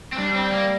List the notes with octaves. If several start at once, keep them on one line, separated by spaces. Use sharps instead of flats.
C4
G3 D4
C4
A#3